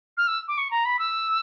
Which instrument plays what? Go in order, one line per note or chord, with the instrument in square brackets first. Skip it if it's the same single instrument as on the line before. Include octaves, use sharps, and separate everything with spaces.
[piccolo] F6
E6
D6
C#6
A#5
B5
E6